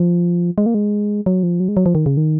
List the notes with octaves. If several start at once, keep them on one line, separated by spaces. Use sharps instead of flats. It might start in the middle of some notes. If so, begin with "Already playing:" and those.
Already playing: F3
G#3
A#3
G#3
F#3
F3
F#3
G#3
F#3
F3
D#3
C#3
D#3